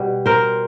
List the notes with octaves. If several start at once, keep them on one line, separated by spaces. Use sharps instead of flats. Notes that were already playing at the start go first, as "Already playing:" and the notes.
Already playing: B2 G3
A#4 C5